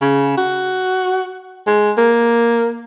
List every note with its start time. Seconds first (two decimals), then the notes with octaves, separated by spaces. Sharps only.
0.02 C#3
0.38 F#4
1.67 G#3
1.98 A#3